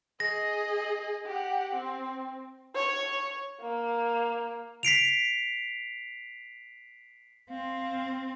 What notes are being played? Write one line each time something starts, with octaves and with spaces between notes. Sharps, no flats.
G#4 D#5 A#6
G4 F#5
C4
C#5
A#3
B6 C7 D7 F7
C4 F5